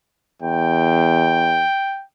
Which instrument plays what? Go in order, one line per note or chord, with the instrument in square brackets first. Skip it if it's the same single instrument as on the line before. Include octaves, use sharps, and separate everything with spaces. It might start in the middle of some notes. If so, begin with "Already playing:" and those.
[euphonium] E2 [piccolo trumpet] G5